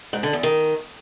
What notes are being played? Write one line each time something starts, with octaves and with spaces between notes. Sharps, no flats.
G#2
D3
E2
D#3